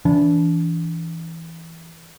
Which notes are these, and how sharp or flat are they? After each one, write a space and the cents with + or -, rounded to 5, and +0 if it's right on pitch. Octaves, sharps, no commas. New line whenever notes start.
E3 +0 D4 -25